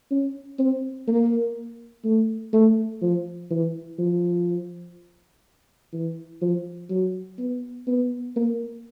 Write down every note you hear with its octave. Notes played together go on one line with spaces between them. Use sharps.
C#4
C4
A#3
A3
A3
F3
E3
F3
E3
F3
F#3
B3
B3
A#3